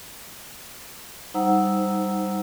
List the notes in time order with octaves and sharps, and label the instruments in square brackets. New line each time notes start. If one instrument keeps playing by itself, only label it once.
[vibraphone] G3 D#4 C5 F#5 A#5 E6